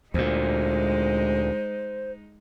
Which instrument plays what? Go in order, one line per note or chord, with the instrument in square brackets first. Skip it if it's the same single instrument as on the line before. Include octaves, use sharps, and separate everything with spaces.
[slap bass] D2 A#2 [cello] G#3 D#4 [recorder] C5